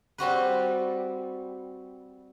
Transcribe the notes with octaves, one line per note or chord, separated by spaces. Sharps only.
G3 C4 F#4 B4